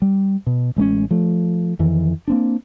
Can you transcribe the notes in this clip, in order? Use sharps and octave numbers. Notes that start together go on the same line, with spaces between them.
G3
B2
A1 G#3 A#3 C#4
F3 A3
F2 D#3 E3
A#3 C4 D4